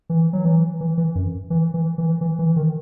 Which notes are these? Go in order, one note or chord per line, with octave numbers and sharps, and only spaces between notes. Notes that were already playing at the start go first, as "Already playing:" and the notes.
E3
F#3
E3
E3
E3
F#2
E3
E3
E3
E3
E3
D#3